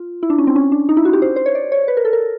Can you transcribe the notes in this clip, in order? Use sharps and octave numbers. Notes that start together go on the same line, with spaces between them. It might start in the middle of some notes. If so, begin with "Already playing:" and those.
Already playing: F4
E4
D4
C#4
C4
C#4
D4
D#4
E4
F#4
G4
C5
C5
C#5
D5
C#5
B4
A#4
A4
A#4